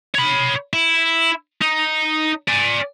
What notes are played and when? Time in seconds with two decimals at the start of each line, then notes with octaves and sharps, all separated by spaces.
0.15 C#5 B5
0.73 E4
1.61 D#4
2.48 D5 G#5